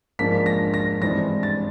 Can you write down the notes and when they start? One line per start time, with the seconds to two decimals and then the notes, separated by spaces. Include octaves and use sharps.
0.19 G#2 F3 A#3 D4 B6
0.46 A#6
0.74 A#6
1.01 G2 E3 G#3 C4 A#6
1.43 A6